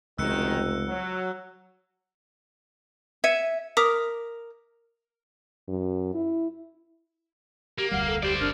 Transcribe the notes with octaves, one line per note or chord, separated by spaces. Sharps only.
F1 C#2 F#2 C3 D#3 E6 F#6 C#7
F#3
E5 G#6 C#7 D#7
A#4 D6 D#6 B6
F#2
E4
A#3 G4
F1 D2 G3 F5 F#5
A4
G4 C5 D5
G1 D4 A#4